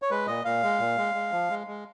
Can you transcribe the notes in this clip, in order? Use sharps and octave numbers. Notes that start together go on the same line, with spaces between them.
C#5
G#3 B4
A#2 D#5
A#2 F5
G#3
A#2
G#3
G#3
F3
G#3
G#3